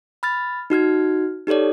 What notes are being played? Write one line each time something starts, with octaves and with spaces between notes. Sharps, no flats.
B5 F6 A6
D#4 F#4 F6 G#6
D#4 G4 A4 C#5 D5